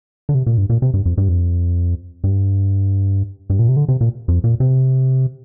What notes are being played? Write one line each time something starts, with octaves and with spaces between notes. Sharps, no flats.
D3
C3
A#2
G2
A#2
C3
G2
F2
G2
F2
G2
G2
A#2
C3
D3
C3
A#2
F2
A#2
C3